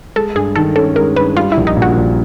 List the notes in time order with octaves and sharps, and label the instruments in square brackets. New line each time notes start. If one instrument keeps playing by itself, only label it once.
[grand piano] G#3 [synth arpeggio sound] A4
[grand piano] G2 [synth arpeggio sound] G#4
[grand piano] D#3 [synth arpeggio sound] A4
[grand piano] C#4 [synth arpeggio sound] A4
[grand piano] G#3 [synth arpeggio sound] A#4
[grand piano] G2 [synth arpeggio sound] B4
[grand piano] G3 [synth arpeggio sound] F4
[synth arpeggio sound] E4
[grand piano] A#1
[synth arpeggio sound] D#4
[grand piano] A#2
[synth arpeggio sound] F#4
[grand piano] A#1